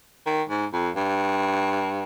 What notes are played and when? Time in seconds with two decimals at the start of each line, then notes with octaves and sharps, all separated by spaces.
0.26 D#3
0.49 G#2
0.73 F2
0.96 G2